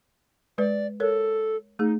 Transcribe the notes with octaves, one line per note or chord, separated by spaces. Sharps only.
G#3 B4 D5
A4 A#4 C#5
A3 D#4 G#4